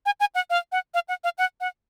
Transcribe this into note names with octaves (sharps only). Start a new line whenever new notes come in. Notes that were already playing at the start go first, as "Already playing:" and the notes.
G#5
G#5
F#5
F5
F#5
F5
F#5
F5
F#5
F#5